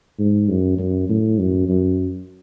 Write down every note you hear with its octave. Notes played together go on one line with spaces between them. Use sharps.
G#2
F#2
F#2
A2
F#2
F#2